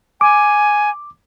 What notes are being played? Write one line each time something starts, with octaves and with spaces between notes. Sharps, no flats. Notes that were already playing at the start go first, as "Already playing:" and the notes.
G#5 D6